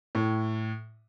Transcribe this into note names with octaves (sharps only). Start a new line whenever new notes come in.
A2